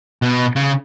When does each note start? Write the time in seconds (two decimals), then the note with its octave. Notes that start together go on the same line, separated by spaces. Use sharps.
0.22 B2
0.56 C#3